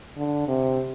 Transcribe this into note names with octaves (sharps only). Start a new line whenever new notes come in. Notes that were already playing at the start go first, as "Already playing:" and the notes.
D3
C3